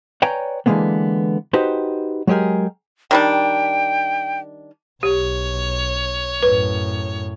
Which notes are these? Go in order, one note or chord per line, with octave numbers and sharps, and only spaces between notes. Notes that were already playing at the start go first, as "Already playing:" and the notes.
B4 C#5 D5 G5 G#5 A#5
D3 E3 F#3 G#3 A#3 B3
D#4 F#4 G4 B4 C5
F#3 G#3 G4 G#4 A#4
D#3 G3 D4 G5
B1 G4 C#5
F#2 A2 B4